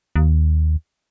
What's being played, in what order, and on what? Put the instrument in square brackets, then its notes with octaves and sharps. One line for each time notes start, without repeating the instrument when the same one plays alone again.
[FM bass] D#2